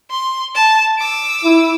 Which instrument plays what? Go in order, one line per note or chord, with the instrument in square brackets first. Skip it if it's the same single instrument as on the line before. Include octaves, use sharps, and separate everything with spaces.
[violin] C6
A5
D6 E6
[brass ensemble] E4